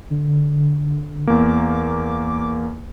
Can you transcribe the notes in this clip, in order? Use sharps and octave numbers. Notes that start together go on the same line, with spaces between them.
D3
E2 A#3 D6